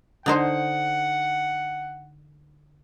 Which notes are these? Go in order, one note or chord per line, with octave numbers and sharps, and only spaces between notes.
D3 D#4 C5 F#5